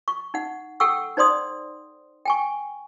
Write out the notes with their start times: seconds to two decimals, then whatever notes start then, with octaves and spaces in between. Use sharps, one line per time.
0.08 C#6
0.34 D#4 F#5
0.80 A4 F#5 G5 C#6 E6
1.17 D#4 C5 D5 C6 D#6
2.25 G5 G#5 C#6